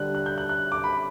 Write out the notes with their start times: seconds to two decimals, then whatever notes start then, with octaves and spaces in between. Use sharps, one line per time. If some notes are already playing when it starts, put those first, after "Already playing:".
Already playing: D3 G3 D4 F#6
0.15 F#6
0.26 G6
0.38 F#6
0.49 F#6
0.72 D6
0.84 B5